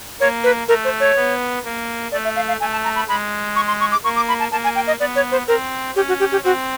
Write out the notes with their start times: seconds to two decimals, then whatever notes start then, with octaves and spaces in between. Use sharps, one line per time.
0.20 A#3 C#5
0.44 B4
0.68 A3 A#4
0.85 C5
1.00 C#5
1.16 B3
1.64 A#3
2.12 A3 D5
2.24 E5
2.36 F5
2.48 F5
2.60 A3 G#5
2.72 A5
2.84 A#5
2.96 B5
3.08 G#3 B5
3.56 C#6
3.68 C6
3.80 C#6
3.92 D6
4.04 A#3 C#6
4.16 D6
4.28 B5
4.40 A5
4.52 A#3 A5
4.64 G#5
4.76 G5
4.87 D#5
5.00 B3 D5
5.16 C#5
5.32 C5
5.48 C4 A#4
5.96 C#4 G4
6.08 F#4
6.20 G4
6.32 G4
6.44 C4 F#4